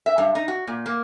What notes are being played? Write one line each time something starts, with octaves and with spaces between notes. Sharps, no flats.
E5
G2
D#4
F#4
A#2
A#3